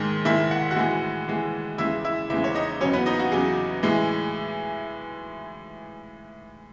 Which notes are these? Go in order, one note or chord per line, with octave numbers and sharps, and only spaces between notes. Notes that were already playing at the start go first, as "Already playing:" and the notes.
Already playing: G#2 D#3 G#3
G#2 D#3 G#3 E4 E5
F#5
F#4 F#5
A2 E3 G#3
A2 E3 G#3
E2 C#3 G#3 E4 E5
E4 E5
E2 C#3 G#3 E4 E5
C#5
D#4 D#5
E2 C#3 F#3 C#4 C#5
B3 B4
D#4 D#5
F#4
E2 C#3 F#3 G#4
A2 E3 G#3